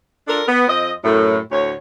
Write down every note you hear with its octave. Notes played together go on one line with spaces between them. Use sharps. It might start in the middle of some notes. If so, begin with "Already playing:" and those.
D4 F4 A4 A#4 D5
B3
F2 C4 D#5
F#2 A2
D2 A2 C#5